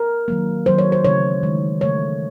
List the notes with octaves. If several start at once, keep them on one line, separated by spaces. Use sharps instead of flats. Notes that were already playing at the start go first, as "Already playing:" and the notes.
Already playing: A#4
D#3 F#3 A#3
D#3 F#3 A#3 C5
C#5
C5
C#3 E3 A3 C#5
D#3 G#3
C#3 E3 A3 C#5